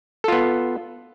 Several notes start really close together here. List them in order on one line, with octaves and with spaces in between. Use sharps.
A4 F4 B3